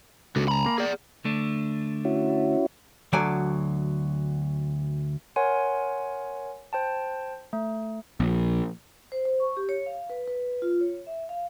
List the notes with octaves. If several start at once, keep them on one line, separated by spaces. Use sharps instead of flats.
C#2 F#4 A4
A#5 B5
A#3
G#4 D5
D3 A3 D4
C#4 E4 F#4
D2 F#3 A4 D5 G#5
A#4 C#5 F#5 G#5 C6
C5 G5 A5
A3
A#1
C5
C5
C#6
G4
C#5
F5
B4
B4
F4
C#5
E5
F5